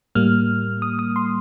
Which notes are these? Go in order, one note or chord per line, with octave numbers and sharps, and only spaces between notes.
A2 G3 A#3 F6
D#6
D#6
C6